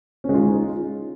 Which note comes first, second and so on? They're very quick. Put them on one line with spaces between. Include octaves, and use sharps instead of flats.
C#4 G#3 F4 D#4